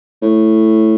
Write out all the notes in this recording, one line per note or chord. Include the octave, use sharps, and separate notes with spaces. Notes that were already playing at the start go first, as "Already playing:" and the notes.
A2